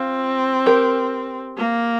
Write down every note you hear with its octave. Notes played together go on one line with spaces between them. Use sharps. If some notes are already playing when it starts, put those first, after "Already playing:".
Already playing: C4 F4
G4 A#4
A#3